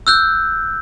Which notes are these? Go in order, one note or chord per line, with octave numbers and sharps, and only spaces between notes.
E6 F#6 G6